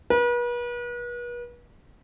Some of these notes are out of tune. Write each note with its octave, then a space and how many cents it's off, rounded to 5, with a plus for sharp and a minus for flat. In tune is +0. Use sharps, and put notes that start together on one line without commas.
B4 -40